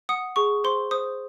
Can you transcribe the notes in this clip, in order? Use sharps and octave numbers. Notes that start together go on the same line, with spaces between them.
F#5 D#6
G#4 C#6
C5 C6
C5 D#6